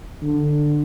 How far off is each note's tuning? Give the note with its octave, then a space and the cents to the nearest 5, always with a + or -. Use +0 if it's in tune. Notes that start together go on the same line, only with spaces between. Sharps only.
D3 +10